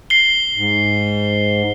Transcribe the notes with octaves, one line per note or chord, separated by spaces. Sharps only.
C7 G7
G#2